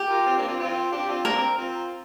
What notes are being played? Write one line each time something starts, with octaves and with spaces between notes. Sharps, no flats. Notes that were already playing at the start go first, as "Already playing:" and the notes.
Already playing: G4
F4 A#4
C4 F4
A#3 D4
C4 F4
C4 F4
D4 G4
C4 F4
A#3 D4 A#4
C4
C4 F4